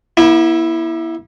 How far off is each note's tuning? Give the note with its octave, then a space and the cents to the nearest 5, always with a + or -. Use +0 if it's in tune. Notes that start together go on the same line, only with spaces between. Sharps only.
B3 -45 E4 +0